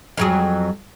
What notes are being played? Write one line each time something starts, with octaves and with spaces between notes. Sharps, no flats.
F2 F#3 G#4